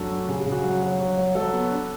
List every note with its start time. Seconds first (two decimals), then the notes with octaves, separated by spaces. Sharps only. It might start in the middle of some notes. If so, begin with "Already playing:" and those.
Already playing: F#2 A3 D4 F#4 A4
0.11 D4
0.28 C#3 G#4
0.40 G#4
0.46 C#3
0.52 F#4
0.64 F#3 F#4
0.82 F#3 F#4
1.00 F#3
1.17 F#3
1.35 F#3 A4
1.53 B3
1.71 D4